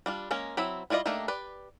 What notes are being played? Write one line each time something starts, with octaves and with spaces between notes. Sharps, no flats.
G3 D4 F4
G#3 A#3 C#4 A#4
F#3 C4 E4 B5
G3 E4 F4 D5 D#5
A3 A#3 D4 D#4 G4
G4 B4 D5